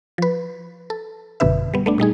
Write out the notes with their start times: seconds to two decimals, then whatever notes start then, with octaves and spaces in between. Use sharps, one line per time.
0.18 F3 B4
0.90 A4
1.40 G#1 F#2 B2 D3 B4 E5
1.74 G3 B3
1.86 A3 B3 D4
1.98 A#2 G3 D#4 G#4